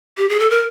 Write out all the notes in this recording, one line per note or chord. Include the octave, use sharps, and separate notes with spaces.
G4
G#4
A4
A#4